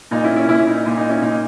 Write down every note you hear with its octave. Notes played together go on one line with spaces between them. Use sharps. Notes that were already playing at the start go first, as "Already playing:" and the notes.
A#2 D#4
C#4 E4
C#4 E4
A#2 C#4 E4
D#4
A#2
D#4
C#4 E4
A#2 D#4